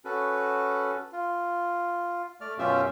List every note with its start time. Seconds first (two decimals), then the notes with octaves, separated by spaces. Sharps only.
0.05 C#4 F#4 A4 B4
1.12 F4
2.41 A3 D5 F6
2.59 F#2 B2 C#4 F4 G4 E5